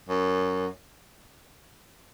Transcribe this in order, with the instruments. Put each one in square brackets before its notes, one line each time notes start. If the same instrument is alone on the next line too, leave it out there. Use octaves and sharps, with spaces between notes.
[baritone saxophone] F#2